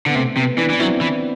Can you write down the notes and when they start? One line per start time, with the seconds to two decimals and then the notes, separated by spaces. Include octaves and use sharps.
0.06 D3 B3
0.15 C3 A3 C4
0.36 C3 B3
0.58 E3 B3 D4
0.70 E3 D4
0.79 F#3 C4 E4
1.01 E3